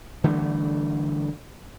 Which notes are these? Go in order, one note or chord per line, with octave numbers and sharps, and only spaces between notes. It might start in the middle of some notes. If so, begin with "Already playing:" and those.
D3 E3 G3 A3